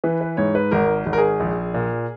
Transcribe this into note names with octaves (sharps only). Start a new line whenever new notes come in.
E3 B4
B4
G#2 C#5
B4
G#1 A#4
G#1
A#4
G#4
A#1
A#2